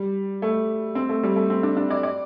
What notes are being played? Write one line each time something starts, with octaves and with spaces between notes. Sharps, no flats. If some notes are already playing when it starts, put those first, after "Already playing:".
Already playing: G3
A3
C4
A3
G3
A3
C4
D4
D4
D5
D5